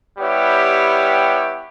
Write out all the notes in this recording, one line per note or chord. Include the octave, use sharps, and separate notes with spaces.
G3 B3 E4 G4 C#5